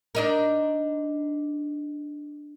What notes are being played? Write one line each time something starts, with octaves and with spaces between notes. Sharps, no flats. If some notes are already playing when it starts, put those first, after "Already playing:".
D4 D#4 A#4